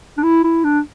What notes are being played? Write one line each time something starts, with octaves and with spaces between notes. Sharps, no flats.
D4
E4
E4
D4